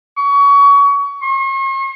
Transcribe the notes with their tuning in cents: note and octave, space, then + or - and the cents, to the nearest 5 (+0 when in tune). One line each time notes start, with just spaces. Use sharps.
C#6 +25
C#6 -45